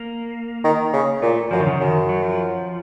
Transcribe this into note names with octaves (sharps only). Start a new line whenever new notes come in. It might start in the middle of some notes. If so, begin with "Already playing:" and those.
Already playing: A#3
D#3
C#3
A#2 A3
F#2 F3
D#3
C#3
F#2 D#3
F#3
F3